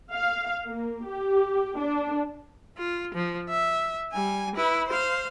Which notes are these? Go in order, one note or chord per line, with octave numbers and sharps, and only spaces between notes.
F5
A#3
G4
D4
F4
F3
E5
G3 G#5
E4 B4
C5 F5